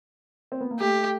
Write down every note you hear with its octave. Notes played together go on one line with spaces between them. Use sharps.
C4
B3
A#3
A3 G4